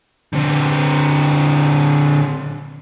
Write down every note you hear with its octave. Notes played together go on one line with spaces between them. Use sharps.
D3 C4